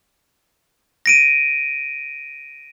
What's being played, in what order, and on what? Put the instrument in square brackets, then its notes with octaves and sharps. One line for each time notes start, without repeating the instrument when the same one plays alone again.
[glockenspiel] A#6 D7 D#7